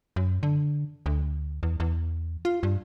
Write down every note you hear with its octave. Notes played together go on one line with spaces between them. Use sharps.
F#2
D3
D2
E2
E2
F4
G2